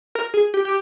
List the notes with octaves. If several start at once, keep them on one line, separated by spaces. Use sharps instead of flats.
A#4
G#4
G4
G4